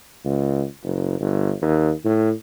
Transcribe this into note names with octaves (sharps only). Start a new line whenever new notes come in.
C#2
F#1
G1
D#2
A2